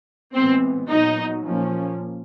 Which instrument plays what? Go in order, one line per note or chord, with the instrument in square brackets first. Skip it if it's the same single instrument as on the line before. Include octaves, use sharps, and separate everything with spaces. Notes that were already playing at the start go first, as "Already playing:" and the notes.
[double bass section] A2 E3 G#3 B3 [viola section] C4
[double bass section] A#2 F#3 B3 [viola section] D#4
[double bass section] A#2 F3 A#3 C#4